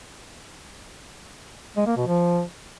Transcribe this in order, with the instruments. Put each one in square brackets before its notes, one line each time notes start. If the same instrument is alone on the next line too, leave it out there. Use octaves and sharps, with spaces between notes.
[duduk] G#3
A#3
B2
F3